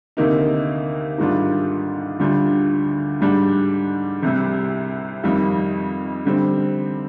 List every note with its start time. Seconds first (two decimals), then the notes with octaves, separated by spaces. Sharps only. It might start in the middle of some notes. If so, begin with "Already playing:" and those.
0.17 D2 C3 D#3 A#3 D#4
1.18 G#2 D#3 G3 D4 F4
2.20 D2 D3 G3 D4 F4
3.21 G#2 G3 D4
4.23 C2 C3 G3
5.23 F2 D#3 G3
6.25 D3 G3 C4